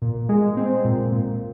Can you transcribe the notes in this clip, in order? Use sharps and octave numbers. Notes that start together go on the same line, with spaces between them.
A#2
G#3
C4
A#2
A#2